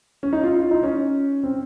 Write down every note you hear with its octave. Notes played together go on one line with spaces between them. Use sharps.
C#4
D#4
F4
F4
D#4
C#4
C4